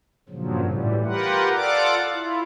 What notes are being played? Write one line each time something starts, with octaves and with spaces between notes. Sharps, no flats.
G2 A#2 C#3 F3 F#3
A2 E3 G3
F4 G4 A#4 B4 F#5
F4 A4 D5 F5 F#5 D6
E4 F4